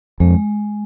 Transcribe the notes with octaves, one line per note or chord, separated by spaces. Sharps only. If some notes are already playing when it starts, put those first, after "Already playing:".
F2 G#3